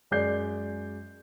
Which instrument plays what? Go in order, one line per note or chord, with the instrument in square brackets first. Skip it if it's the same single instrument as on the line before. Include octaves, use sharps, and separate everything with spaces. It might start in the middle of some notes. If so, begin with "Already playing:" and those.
[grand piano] F#2 G#3 D5 G6 C7